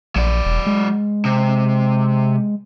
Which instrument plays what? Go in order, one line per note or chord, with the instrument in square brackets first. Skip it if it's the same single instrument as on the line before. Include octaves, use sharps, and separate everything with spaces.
[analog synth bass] A#1 [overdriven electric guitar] F#3 D5
[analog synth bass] E1
G#3
[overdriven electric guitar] C3